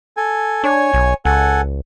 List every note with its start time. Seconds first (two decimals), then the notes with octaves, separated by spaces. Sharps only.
0.17 A4 G#5
0.64 D4 C#5 G#5
0.94 B1
1.25 C#2 A4 F#5 G#5